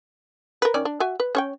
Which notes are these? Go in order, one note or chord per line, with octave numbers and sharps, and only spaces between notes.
A#4 B4
D#3 C#4 D5
D4
F#4 E5 G#5
B4
C#4 C#5 G5